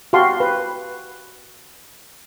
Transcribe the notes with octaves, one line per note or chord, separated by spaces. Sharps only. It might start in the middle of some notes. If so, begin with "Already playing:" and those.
F#4 G4 F5 A5 C6
B4